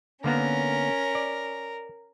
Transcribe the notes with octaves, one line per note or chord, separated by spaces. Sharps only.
D3 A#3 B3 C#4 A#4
D5